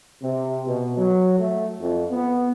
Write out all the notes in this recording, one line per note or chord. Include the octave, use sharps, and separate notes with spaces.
C3
B2
F#3
A3
F2
B3